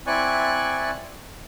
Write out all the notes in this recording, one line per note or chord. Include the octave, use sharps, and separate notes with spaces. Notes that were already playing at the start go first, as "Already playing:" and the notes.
C4 E4 D5 G#5 C#6 F#6